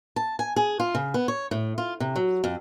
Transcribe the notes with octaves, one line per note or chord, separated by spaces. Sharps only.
A5
G#5
G#4
F4
C#3
B3
C#5
A2
F4
C3
F#3
F2